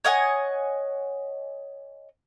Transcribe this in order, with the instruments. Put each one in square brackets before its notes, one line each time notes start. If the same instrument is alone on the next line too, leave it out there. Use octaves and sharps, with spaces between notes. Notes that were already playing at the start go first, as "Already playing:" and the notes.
[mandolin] C#5 D#5 F#5 G#5